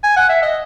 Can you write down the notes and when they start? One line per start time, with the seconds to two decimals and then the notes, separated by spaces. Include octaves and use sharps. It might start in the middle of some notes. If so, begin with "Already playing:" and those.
0.04 G#5
0.17 F#5
0.29 E5
0.42 D#5